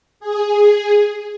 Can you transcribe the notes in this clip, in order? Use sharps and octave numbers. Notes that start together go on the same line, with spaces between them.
G#4